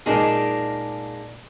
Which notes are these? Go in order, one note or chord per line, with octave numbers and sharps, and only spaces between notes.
A#2 G#3 D4 D#4 G#4 A#4